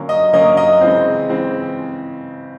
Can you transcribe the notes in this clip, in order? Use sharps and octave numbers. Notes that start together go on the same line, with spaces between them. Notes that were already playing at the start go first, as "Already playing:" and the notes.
Already playing: D3 F#3 A#3 C#4
D#5
D3 F#3 A#3 C#4 D#5
D#5
C#3 E3 G#3 C4
C#3 E3 G#3 C4